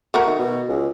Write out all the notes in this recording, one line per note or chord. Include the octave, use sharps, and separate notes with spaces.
A3 F#4 A#4
D#3
B2
C#2